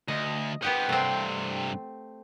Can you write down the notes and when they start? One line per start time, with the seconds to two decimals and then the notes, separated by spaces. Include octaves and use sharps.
0.08 D2 D#5
0.62 B3 G4 C5 D#5 F#5
0.89 G2 C3 A3 C4